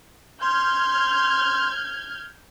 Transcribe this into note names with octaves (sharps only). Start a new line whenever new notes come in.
C6 F6 G6 G#6